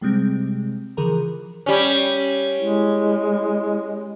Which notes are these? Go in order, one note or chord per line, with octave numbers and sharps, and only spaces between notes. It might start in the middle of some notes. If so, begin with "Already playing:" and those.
C3 G3 G#3 C4
C#3 E3 F3 G#4 A#4 A#5
G3 C#4
G#3 E4